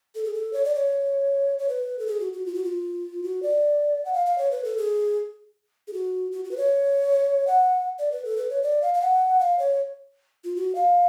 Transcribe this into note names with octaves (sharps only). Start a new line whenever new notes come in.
A4
G#4
A4
C#5
D5
C#5
C#5
B4
A4
G#4
F#4
F#4
F4
F#4
F4
F#4
D5
F#5
F5
F5
C#5
B4
A4
G#4
G#4
F#4
F#4
F#4
B4
C#5
F#5
D5
B4
A4
B4
C#5
D5
F5
F5
F#5
F5
C#5
F4
F#4
F5